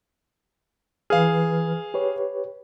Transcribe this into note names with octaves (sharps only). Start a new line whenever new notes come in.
E3 G#4 B4 F5 F6
G4 B4 C#5